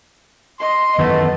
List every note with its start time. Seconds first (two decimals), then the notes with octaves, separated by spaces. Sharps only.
0.60 D#5 C6
0.98 F#2 D#3 E3 A3 B3